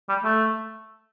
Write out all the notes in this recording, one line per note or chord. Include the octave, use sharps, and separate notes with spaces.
G3
A3